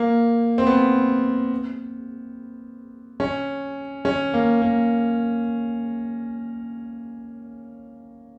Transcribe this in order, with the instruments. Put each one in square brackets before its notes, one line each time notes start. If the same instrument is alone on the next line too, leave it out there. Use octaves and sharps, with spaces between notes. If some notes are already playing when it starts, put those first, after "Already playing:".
Already playing: [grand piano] A#3
C4
B3
C#4
C#4
A#3
A#3